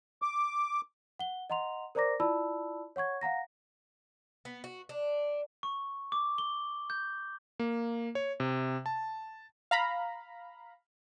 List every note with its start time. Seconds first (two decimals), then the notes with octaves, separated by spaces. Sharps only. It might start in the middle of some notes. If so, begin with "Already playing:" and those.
0.22 D6
1.19 F#5 G7
1.50 D#5 F#5 A#5 C6 F7
1.95 A#4 C5 D5 A#5 D6 A#6
2.20 E4 F4 D5 A5 B5 E6
2.96 C#5 F#5 C#6 G#6
3.21 F5 F#5 A#5 A#6
4.45 B3
4.64 F#4
4.89 D4
5.63 C#6
6.12 D6
6.38 G7
6.90 G6
7.60 A#3
8.15 C#5
8.40 C3
8.86 A5
9.71 F5 A#5 B5